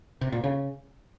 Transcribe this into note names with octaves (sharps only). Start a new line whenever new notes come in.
C3
A#2
C#3